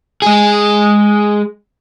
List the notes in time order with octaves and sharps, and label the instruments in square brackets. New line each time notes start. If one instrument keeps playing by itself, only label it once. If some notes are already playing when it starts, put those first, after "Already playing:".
[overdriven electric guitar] G#3 G#4